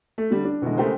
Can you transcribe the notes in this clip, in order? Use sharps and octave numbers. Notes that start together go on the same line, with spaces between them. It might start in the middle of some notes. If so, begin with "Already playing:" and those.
A3
D3 G3
D4
B2 D3 E3 F#3 G#3
C#3 G#3 A3 G4 A#4 C5